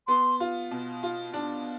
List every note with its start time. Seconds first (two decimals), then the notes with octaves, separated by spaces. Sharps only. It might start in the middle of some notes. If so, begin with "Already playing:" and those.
0.08 B3 C6
0.40 F4
0.71 B2
1.03 F4
1.33 D4